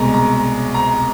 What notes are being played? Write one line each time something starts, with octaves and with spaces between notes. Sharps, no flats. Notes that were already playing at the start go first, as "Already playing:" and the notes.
Already playing: C2 B2 G#3 A#5
A#5
A#5